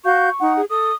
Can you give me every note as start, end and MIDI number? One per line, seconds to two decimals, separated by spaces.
0.05 0.29 66
0.05 0.29 77
0.05 0.53 85
0.05 0.29 91
0.39 0.61 63
0.39 0.61 78
0.56 0.65 68
0.70 0.92 69
0.70 0.95 87